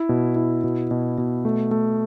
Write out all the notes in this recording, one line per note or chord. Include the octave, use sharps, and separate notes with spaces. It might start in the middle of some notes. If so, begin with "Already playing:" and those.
Already playing: E4
B2
E4
B2
B2
B2
A3
A3